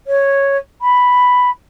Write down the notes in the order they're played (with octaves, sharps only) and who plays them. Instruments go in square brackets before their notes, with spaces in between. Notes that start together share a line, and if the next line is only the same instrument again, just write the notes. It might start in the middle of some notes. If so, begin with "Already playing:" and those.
[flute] C#5
B5